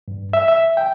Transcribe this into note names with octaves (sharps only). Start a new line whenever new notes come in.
G2
E5
E5
G5